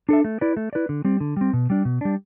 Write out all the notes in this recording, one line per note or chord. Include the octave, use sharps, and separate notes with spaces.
D4 A4 E5
A3
E4 B4 D5
A3
E4 B4 D5
D3
G3 C4
D3
G3 C4
B2
G3 D4
B2
G3 D4